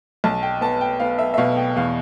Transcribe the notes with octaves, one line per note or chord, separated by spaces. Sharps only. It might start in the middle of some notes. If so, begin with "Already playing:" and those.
B1 A5
G5
B3 A5
G5
B3 F5
E5
E5
B2 F5
G5
E2 F5